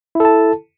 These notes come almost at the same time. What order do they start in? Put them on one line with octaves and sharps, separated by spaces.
E4 A4 A5